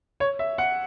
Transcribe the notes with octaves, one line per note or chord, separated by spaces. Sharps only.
C#5
E5
F#5